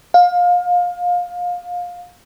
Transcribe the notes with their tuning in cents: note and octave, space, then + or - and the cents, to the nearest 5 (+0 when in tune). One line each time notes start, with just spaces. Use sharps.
F5 +25